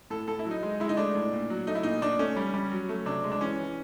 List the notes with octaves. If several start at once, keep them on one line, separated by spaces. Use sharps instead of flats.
A2 A4
A2 A4
E4
F#3
D#4
G#3
G#3 E4
D#4
A3 D4
A2
A#2
F#3
A3 D#4
E4
A#2 D#4
A#2 D4
A3 C#4
G3
G3
F#3
A3
C3 D4
G#3
D4
E3 C#4
E3